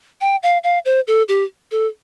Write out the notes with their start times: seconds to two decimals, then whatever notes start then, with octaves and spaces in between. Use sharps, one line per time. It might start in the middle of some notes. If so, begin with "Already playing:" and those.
0.21 G5
0.43 F5
0.64 F5
0.85 C5
1.07 A4
1.28 G4
1.71 A4